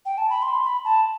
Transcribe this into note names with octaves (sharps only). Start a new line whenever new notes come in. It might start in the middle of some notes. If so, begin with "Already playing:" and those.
G5
A5
B5
C6
B5
A5